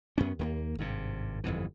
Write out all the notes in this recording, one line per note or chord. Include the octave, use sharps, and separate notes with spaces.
F#2 B3 C#4
D#2 G3 A#3
G#1 G2 C3
G1 F2 G#2 E3